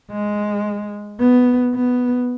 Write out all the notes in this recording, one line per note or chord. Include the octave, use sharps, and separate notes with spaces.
G#3
B3
B3